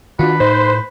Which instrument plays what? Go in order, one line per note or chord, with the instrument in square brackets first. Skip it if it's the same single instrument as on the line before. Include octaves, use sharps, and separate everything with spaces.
[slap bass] D#3 D4 [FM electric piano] F4 F#4 [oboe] B4
[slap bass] A2 [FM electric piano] D#4 [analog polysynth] C5